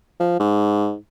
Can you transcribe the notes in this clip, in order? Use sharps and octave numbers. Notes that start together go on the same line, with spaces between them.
F3
G#2